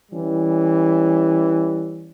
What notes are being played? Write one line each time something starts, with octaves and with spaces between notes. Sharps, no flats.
E3 G3 C#4